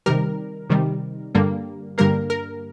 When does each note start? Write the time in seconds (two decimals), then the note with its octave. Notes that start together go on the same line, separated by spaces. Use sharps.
0.06 C3 D#3 G3 A#4
0.70 C3 D#3 G3
1.35 G2 D3 G3 A#3
1.98 G2 D3 G3 A#3 A#4
2.30 A#4